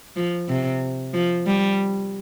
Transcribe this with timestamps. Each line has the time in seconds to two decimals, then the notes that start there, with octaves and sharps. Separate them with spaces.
0.16 F3
0.49 C3
1.14 F3
1.47 G3